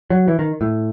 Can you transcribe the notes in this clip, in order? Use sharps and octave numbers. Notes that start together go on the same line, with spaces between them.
F#3
E3
D#3
A2